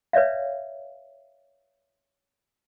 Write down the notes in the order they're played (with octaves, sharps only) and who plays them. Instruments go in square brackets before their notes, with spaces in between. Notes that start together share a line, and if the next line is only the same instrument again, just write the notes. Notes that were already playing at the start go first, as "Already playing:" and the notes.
[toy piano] B4 C#5 D5 E5 F5